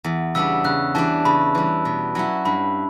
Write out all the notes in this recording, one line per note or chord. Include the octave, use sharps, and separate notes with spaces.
E2
C#3 G3 B3 D4 E6
C#3 F#6
E3 G3 D4 A5
C#3 B5
E3 G3
B2
F#3 C#4 E4
G2 B5